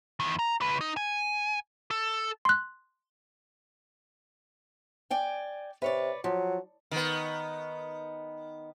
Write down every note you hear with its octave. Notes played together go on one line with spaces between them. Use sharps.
E2 D#3
A#5
C#2 B4
D#4
G#5
A4
C6 F#6
D5 G5 G#5
C3 B4 C#5 D5
F3 F#3
D#3 B3